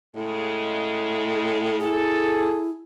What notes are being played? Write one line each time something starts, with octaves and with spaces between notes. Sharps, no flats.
A2 C#3 G#3
E4 G#4 A4